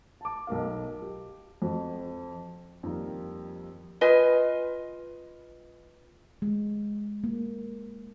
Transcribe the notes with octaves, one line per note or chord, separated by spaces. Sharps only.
A5 D6
B1 B2 A#4 F5
G4
F2 F#4
F2 D#3 G3 A#3
F4 B4 D#5 G#5
G#3
A#3